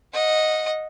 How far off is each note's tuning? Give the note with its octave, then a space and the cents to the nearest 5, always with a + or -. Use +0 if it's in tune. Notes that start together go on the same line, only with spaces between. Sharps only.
D#5 +0 F#5 -25